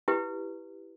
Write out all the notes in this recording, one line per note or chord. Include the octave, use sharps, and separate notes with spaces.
E4 G4 B4